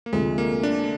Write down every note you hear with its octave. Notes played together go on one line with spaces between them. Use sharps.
A#3
D2 C3 F3 G#3
A#3
D4